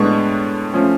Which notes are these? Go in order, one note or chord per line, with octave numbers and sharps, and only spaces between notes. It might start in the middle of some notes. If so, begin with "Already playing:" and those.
Already playing: A2 G#3 B3 D4 C#6
F3 A3 C#4